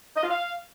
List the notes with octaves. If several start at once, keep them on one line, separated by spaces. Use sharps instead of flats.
D#5
F4
F5